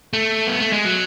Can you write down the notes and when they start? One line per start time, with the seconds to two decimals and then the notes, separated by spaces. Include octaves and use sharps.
0.13 A3
0.47 B3
0.60 A3
0.72 G#3
0.85 F#3